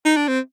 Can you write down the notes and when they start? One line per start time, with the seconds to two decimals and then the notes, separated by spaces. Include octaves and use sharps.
0.05 D#4
0.16 D4
0.28 C4